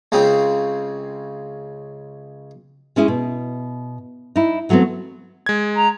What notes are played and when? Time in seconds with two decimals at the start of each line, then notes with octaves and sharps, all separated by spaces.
0.12 C#2 C#3 C4
2.96 G#3 C#4 E4 G#4
3.08 B2
4.36 D#4 E4
4.69 E3 F#3 A3 B3 C4
5.46 G#3 G#6
5.76 A#5